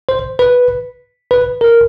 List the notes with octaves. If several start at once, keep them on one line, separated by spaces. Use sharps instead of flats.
C5
B4
B4
A#4